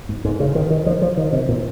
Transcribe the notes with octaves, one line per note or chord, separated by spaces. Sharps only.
G#2
G#2
C#3
D#3
D#3
F3
F3
D#3
C3
A#2